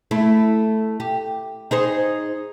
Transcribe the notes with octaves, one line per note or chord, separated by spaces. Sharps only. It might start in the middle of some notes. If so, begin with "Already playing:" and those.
A3 E4
G4
D#4 G#4 C5